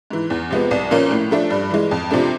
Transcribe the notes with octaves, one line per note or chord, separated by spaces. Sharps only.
G#2 E3
E2
C3 F3 G#3 B3
C2
A#2 F3 A#3 C#4
A2
F3 A3 D4
G2
E3 G#3
F2
C3 F3 A3 D4